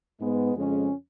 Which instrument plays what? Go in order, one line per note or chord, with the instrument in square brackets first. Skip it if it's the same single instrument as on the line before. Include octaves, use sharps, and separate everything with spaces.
[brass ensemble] G#2 G#3 B3
F2 C#3 G#3 C#4